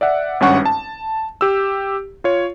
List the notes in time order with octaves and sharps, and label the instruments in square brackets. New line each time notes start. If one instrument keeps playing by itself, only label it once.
[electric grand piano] D5 E5 F#5
G#1 G2 C#4 F#5 C#6
A5
G4 E6
F4 C#5